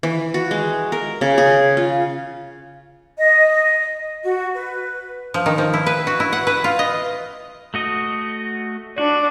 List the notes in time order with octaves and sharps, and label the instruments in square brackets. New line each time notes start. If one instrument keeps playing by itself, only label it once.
[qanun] E3
F#4
G#3
A#4
C#3
G#4
F4
[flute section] D#5
F#4
B4
[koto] F3
D#3
F3
E4
B4
F#4
E4
F#5
B4
F4
D#5
[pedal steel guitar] A3 F#4 D#5
[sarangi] D4 [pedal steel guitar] F#4